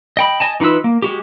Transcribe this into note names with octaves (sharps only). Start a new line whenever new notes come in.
D#5 G5 B5
D#5 G#5 A5
E3 D#4 F4 B4 E6
A#3
G#3 F#4 G4